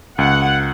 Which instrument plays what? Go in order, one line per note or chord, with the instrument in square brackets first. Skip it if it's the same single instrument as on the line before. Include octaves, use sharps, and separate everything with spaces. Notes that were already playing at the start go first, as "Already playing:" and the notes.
[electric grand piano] C#2 [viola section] F#5